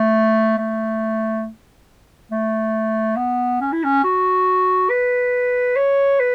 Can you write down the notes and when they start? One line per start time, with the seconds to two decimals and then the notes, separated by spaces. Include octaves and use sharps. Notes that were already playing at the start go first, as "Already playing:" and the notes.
Already playing: A3
0.58 A3
2.31 A3
3.17 B3
3.61 C#4
3.72 E4
3.84 C#4
4.04 F#4
4.90 B4
5.76 C#5
6.20 B4